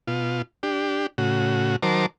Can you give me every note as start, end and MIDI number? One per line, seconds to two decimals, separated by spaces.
0.08 0.42 47
0.08 0.42 65
0.63 1.07 62
0.63 1.07 67
1.18 1.76 45
1.18 1.76 49
1.18 1.76 66
1.83 2.06 51
1.83 2.06 54
1.83 2.06 70
1.83 2.06 72
1.83 2.06 81
1.83 2.06 86